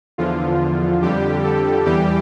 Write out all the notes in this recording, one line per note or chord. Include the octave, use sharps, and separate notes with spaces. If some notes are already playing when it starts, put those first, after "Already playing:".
E2 D3 F3 F4
F2 D3 G3 G4
A4
E2 E3 G3 G4